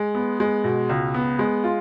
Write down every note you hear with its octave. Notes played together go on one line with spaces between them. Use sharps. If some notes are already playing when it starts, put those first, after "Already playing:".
Already playing: G#3
B3
G#3
B2
C#2
B3
G#3
F4